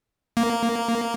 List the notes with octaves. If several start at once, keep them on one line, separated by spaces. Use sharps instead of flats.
A#3